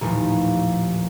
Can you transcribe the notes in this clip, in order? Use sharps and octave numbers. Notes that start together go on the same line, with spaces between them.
A1 D#2 A#2 F3